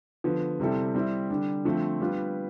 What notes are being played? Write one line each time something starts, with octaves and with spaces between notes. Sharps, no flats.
D3 F3 B3
C3 G3 C4 E4 A4
G3 C4 E4
D3 G3 D4
D3 F3 A3 C4
G3 B3 D4 F4 B4